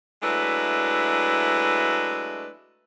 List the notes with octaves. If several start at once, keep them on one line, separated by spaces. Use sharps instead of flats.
F#3 G#3 A3 D4 E4 B4